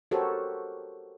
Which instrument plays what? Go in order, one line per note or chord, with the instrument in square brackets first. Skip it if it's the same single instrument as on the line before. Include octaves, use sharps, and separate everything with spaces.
[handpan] F#4 G4 A4 A#4 C5 C#5